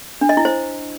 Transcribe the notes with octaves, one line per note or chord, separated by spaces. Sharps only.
D4
D#5
E4
C5